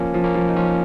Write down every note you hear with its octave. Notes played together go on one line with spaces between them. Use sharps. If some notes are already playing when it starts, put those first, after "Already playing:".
Already playing: F3 A#3 C#4
F3
A#3 C#4
F3
D#4
F3 C#4 F4